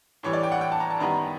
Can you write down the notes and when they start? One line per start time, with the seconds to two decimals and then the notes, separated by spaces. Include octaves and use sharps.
0.23 A2 E3 G3 C#5
0.33 D5
0.43 G5
0.52 F#5
0.61 G5
0.72 A5
0.80 A#5
0.90 A5
0.99 F#2 D#3 G3 B3 A#5